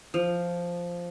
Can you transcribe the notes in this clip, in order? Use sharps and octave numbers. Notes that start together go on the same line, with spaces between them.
F3